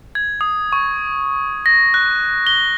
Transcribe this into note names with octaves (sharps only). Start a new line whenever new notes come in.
G#6
D#6
C#6
A#6
F#6
G7